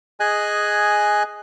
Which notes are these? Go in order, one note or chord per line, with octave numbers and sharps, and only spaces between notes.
G#4 D#5 G#5 F#6